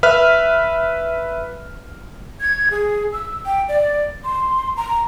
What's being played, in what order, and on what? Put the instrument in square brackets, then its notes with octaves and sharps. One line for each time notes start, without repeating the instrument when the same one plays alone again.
[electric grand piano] B4 E5 F6
[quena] G#6
G#4
E6
G5
D5
C6
A#5